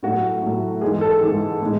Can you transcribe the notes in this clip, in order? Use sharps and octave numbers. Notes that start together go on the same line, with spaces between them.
A2 F#3 F#4
A2 F#3
G#2 E3 G#3 G#4
A4
G#2 E3 G#3 G#4
A2 E3 G#3